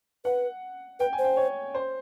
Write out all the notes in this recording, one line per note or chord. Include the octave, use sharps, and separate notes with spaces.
B4 F#5
B4 G5
G#5
C5
G5
C#5
C5